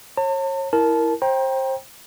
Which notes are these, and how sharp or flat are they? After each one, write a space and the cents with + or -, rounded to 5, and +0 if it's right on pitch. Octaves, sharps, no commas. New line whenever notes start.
C#5 -35 A5 +45
E4 +0 A#4 +0 A5 -20
C5 +25 G5 +0 A#5 +30